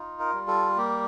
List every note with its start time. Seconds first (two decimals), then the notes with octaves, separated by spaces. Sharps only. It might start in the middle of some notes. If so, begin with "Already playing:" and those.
Already playing: D#4 F4
0.20 A#4
0.33 G3
0.48 A4
0.77 A#3 G4